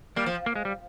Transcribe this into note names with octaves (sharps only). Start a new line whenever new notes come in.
G3 A#3
F3
A#3
G#3
G3